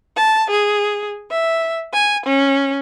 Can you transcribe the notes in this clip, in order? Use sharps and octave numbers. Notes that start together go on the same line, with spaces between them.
A5
G#4
E5
G#5
C#4